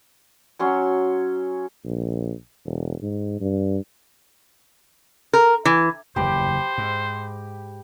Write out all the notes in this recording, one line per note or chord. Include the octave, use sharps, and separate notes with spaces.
F#3 C#4 C6
A#1
E1
G#2
G2
A#4
E3
F#1 E2 G2 G4 C5 B5
G#2